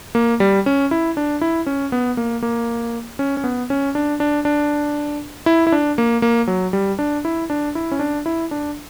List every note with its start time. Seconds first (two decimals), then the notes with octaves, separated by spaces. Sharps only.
0.15 A#3
0.40 G3
0.66 C#4
0.91 E4
1.17 D4
1.41 E4
1.66 C#4
1.92 B3
2.17 A#3
2.42 A#3
3.19 C#4
3.37 C#4
3.44 B3
3.70 C#4
3.95 D4
4.20 D4
4.45 D4
5.46 E4
5.67 E4
5.72 D4
5.98 A#3
6.22 A#3
6.47 F#3
6.73 G3
6.99 D4
7.25 E4
7.50 D4
7.75 E4
7.92 C#4
7.99 D4
8.26 E4
8.51 D4